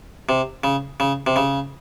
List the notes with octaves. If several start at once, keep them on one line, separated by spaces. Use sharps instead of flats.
C3
C#3
C#3
C3
C#3